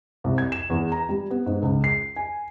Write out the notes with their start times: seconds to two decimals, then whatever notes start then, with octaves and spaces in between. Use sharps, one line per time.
0.24 C2
0.38 G#6
0.52 E7
0.70 E2
0.92 A#5
1.09 G3
1.30 B3
1.46 G#2
1.62 C#2
1.84 C7
2.16 G#5